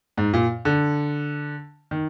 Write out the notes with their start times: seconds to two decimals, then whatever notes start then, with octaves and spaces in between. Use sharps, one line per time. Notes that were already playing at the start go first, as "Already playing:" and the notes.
0.17 G#2
0.34 A#2
0.65 D3
1.91 D#3